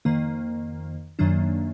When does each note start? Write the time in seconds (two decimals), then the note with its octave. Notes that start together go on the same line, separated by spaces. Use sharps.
0.05 F2 D#3 A#3
1.19 F#2 D#3 F#3 A#3 D4